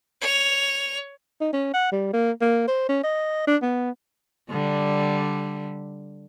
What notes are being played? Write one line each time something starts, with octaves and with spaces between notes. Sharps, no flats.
C#5 F7
D#4
C#4
F#5
G3
A#3
A#3
C5
C#4
D#5
D4
B3
D3 G3